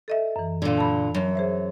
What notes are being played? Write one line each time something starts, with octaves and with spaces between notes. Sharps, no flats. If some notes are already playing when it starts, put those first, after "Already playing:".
A4 D#5 E5
F#2 E3
A#2 D3
A5 B5
F#2
G#4 C5 E5